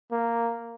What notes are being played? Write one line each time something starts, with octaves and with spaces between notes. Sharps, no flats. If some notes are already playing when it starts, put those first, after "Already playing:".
A#3